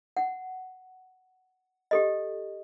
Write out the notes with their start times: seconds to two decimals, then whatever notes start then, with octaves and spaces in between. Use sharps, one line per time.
0.17 F#5
1.91 G4 A4 D#5